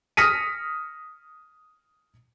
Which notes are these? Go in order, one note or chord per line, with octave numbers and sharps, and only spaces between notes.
D#6 F6 A#6 B6 C#7 D#7